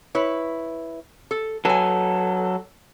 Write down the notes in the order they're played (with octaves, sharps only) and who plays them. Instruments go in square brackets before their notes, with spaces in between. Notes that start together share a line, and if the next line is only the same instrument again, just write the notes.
[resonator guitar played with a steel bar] E4 B4 C#5
A4
[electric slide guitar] F#3 A4 [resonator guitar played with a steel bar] B4 G#5